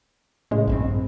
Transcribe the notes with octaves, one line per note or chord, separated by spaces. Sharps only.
A2 C#3 G#3
A#1 G2 C4